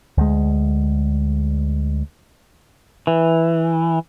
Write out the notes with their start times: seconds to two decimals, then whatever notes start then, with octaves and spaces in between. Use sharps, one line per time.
0.18 D2 G#3
3.07 E3